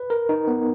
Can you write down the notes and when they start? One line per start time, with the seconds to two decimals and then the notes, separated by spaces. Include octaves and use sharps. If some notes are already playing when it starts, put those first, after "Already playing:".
Already playing: B4
0.10 A#4
0.29 D#4
0.48 B3